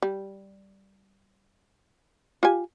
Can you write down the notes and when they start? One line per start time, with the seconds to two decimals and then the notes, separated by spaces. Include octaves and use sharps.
0.02 G3
2.43 F4 G4 G#5